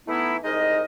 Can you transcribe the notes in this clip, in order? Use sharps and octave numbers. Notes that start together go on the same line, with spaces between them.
E3 A3 B3 D#4 E4
C2 G#3 D#4 A#4 D#5